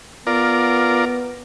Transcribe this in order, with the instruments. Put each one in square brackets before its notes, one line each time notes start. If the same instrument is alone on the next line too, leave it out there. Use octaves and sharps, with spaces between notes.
[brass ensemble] B3 [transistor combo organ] F4 A#4 D5